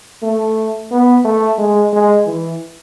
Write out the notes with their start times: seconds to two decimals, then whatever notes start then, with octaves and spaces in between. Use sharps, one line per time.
0.23 A3
0.91 B3
1.25 A3
1.58 G#3
1.93 G#3
2.26 E3